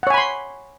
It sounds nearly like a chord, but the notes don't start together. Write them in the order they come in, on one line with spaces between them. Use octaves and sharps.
F#5 C#5 G#5 B5 C6